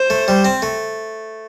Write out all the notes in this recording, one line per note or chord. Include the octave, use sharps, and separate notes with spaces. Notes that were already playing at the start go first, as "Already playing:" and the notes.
Already playing: C5
A3
G3
C4
A3